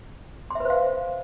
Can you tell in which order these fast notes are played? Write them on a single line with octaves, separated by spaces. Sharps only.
C6 E5 B4 C5 F5